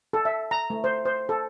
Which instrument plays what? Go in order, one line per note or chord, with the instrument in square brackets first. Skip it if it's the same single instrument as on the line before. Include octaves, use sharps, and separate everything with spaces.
[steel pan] A4
E5
A#5
A3
C5
C5
A4